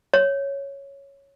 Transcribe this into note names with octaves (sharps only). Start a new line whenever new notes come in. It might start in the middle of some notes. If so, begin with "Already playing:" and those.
C#5